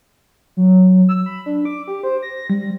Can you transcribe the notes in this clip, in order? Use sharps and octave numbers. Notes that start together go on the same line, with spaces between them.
F#3
E6
B5
D4
D6
G4
C5
A#6
G3